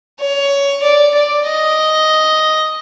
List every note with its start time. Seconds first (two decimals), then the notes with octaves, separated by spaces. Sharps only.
0.20 C#5
0.83 D5
1.14 D5
1.46 D#5